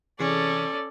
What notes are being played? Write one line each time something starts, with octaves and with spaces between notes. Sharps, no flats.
C3 E3 C#4 G#4 A4 D5